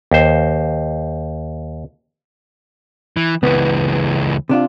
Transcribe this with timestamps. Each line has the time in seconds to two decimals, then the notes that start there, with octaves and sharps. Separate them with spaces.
0.11 D#2 C5
3.17 E3
3.43 C#2 E3 B3
4.49 C3 D4 F4